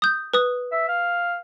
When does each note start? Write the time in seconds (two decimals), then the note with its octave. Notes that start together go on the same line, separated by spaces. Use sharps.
0.02 D#6 G6
0.34 B4 D#6
0.72 E5
0.88 F5